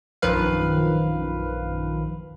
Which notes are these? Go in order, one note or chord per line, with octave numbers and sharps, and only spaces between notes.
A#1 F#2 D#3 F3 B4 F5